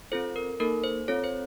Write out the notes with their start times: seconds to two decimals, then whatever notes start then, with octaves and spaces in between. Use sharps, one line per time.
0.12 C4 F4 A4 C5
0.36 A#4
0.60 A#3 D#4 A4 A#4
0.84 C5
1.08 C4 F4 A4 C#5
1.24 C5